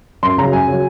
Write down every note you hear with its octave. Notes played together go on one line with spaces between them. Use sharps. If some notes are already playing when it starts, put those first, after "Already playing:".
F#2 C6
C#3 F#3 A#5
F#2 G#5
C#3 F#3